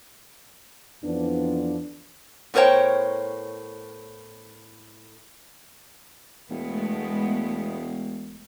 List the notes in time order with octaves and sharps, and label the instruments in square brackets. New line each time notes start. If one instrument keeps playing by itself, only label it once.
[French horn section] F2 E3 F3 B3 D4
[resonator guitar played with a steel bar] A2 B3 A#4 C5 C#5 G5
[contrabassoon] E1 [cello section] G#3 A3 B3